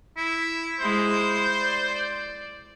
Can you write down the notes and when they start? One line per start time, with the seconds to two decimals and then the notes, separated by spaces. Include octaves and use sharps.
0.17 E4
0.80 G#3 E4 C5
1.62 D5